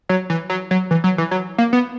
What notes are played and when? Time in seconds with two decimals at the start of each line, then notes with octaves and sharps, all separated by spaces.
0.09 F#3
0.30 E3
0.50 F#3
0.71 F#3
0.91 E3
1.04 F#3
1.18 E3
1.31 F#3
1.58 A#3
1.73 B3